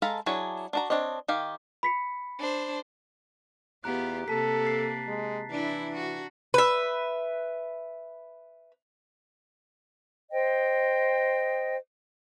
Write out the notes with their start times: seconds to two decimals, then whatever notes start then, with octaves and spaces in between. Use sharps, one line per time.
0.02 G#3 A4 F5 A#5 B5
0.26 F#3 D4 E4 G#4 C#5
0.73 D4 F#4 A#5
0.90 C4 D4 C#5 D#5
1.28 D#3 G4 F5
1.83 B5 B6 C#7
2.39 D4 C5
3.84 E2 B3 F4 G4 A#5 F#6
4.28 C3 A#3 A4 A5 B6
4.65 A6 C7
5.08 G#3
5.50 E3 D4 E4
5.96 F#4
6.54 B4 E5
10.31 C5 D#5 G5